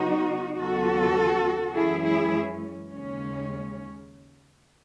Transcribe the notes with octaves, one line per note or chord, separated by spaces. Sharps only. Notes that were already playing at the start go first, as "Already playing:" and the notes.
Already playing: C#3 F#3 B3 D#4 F#4
D#2 C#3 F#3 B3 F#4 A4
F#2 E3 G#3 C#4 E4 G#4
E4 G#4
D#2 C#3 G#3 C#4